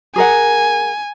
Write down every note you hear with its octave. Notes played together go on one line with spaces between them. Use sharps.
G#4 A#4 F#5 G#5